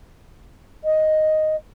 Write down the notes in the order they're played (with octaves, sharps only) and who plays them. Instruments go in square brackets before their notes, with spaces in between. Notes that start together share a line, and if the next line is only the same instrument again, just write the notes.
[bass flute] D#5